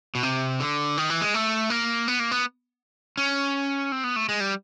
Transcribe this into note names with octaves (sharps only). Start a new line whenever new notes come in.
B2
C3
D3
D#3
E3
G#3
A3
A#3
B3
A#3
B3
C#4
C4
B3
A3
G#3
G3